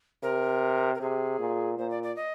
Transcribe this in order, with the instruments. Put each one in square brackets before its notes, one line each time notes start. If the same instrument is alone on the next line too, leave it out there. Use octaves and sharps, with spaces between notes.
[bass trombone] C3 [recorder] A#4
[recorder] A#4
[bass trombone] C3 [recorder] G#4
[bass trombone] A#2
[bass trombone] A#2 [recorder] C5
[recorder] D5
D5
D#5